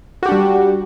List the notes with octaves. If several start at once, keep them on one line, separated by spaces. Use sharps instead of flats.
G3 D4 F#4 G4